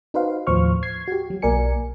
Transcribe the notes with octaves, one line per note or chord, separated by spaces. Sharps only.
D#4 F#4 B4 C5 F5
D#2 A2 F3 C5 C#6 F6
G#6 C7
F#4 G4
F#3
B1 A#3 A#4 D5 G#5 C#7